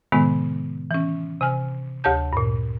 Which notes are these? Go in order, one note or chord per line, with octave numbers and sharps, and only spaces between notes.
A2 C3 D#3 G#3 B3
E3 C#4
C3 G#5 F6
D2 G4 C#5 A5 G6
G2 A#2